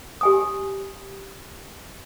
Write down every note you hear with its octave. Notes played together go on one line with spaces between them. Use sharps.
G4 G#5 D#6